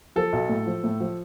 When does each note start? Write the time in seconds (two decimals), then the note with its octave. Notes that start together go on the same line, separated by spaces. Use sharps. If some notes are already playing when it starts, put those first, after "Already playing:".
0.16 F3 A4
0.33 B1
0.49 A2
0.66 F3
0.84 A2
1.00 F3